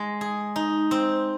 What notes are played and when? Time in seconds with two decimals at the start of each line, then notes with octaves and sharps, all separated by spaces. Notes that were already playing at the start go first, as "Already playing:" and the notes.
Already playing: G#3
0.21 G#4
0.56 D#4
0.91 C4